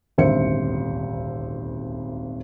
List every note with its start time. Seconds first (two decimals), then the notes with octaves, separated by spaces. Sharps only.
0.18 D#1 G#1 D2 C5 E5 C#7